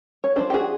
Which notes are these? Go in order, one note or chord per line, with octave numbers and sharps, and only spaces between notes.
C#5
F3 A#3 D4 C5 D5
G4
F#4 G#4